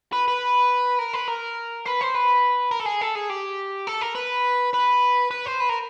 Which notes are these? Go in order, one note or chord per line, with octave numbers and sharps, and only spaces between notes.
B4
B4
A#4
B4
A#4
B4
C5
B4
A#4
A4
G#4
A4
G#4
G4
A4
A#4
B4
B4
B4
C5
B4
A#4